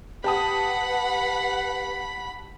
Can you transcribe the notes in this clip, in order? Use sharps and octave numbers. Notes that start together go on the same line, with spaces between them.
G4 B4 F#5 A5 B5 D#6